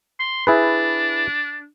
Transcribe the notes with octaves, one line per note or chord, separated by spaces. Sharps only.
C6
D4 E4 G#4 B4